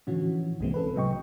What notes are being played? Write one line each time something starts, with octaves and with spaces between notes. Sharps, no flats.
A2 D3 E3 F3 C#4 F#4
C2 G#2 E3 G#3 A#3 C4
C#4 A4 B4
A2 C3 F#3 D#5 G5 C#6